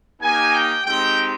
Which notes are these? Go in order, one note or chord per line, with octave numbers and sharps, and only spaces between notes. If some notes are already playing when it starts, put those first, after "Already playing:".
A#3 D#4 G4 G#5
G5
G#3 C4 D#4 G4 G5